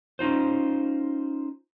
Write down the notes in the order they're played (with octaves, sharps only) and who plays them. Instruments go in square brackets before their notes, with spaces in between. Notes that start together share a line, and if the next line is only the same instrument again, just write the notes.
[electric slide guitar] C#4 D#4 F4 C5